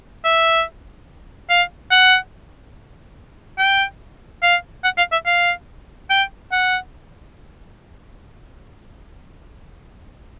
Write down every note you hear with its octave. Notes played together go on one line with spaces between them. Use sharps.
E5
F5
F#5
G5
F5
F#5
F5
E5
F5
G5
F#5